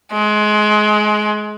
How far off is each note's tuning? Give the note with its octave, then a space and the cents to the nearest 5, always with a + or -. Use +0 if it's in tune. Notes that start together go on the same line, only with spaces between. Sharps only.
G#3 +25